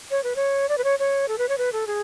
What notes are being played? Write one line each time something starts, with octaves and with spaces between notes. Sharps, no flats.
C#5
B4
C#5
D5
B4
C#5
C#5
A4
B4
C#5
B4
A4
G#4